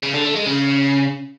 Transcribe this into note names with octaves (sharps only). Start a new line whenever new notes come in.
C#3
D3
A3
G#3
C#3